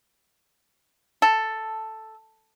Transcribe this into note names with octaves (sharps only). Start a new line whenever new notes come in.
A4